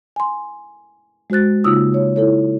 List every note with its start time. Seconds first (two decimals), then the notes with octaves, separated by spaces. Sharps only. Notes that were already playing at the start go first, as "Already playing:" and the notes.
0.16 G#5 C6
1.30 G#3 F#4 C5 F#6 A6
1.64 C#3 A#3 D#4 F4 D#6 E6
1.94 C#5
2.16 E4 A4 C#5